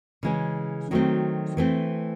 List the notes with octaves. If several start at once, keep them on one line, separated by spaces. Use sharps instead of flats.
C#3 E3 G#3 C#4
D#3 F#3 A3 C4
E3 A3 C4